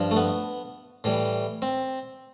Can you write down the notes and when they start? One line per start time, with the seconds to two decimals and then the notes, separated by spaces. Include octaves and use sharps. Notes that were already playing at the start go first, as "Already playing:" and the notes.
Already playing: G2 F3
0.11 A3
0.16 B3
1.04 A2 E3 G3
1.62 C4